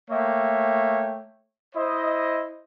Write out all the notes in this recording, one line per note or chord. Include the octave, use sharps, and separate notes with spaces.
A3 A#3 C#5 E5 G5
E4 C5 D#5